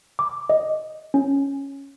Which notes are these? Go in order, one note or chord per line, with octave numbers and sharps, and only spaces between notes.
D6
D#5
C#4